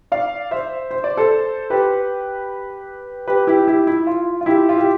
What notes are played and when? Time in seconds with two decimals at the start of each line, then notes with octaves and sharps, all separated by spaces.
0.12 D5 F5
0.51 C5 E5
0.91 C5
1.04 D5
1.17 A4 C5
1.70 G4 B4
3.27 G4 B4
3.47 E4 G4
3.67 E4 G4
3.87 E4
4.07 F4
4.41 F4
4.46 E4 G4
4.69 F4
4.78 G4